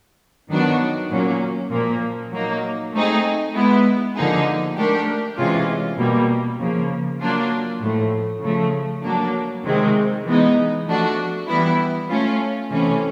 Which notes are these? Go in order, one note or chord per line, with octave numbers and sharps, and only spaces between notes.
D#3 F#3 B3 D4 F#4
A#2 F#3 A#3 C#4
A#2 F3 A#3
F#3 A#3 D#4
A3 C4 D#4 G#4
G#3 B3 E4
D3 F3 A#3 D#4 G#4
A3 D4 G4 A#4
C3 E3 G#3 C#4 F4
B2 G3 A#3
C#3 F3 A#3
F#3 A#3 D4 F4
A2 F3 A3
C#3 F3 A3
F#3 A#3 D4
C3 D#3 G#3 C4
E3 G#3 B3 D#4
F3 A3 D4 F#4
E3 G3 B3 E4
A3 C#4 F4
C3 E3 A3 C#4